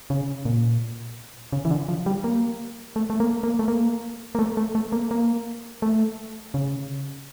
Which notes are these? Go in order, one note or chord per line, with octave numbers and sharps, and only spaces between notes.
C#3
A#2
C#3
E3
D3
F3
G3
A#3
A3
A3
A#3
A#3
A3
A#3
A#3
A3
A3
A3
A#3
A#3
A3
C#3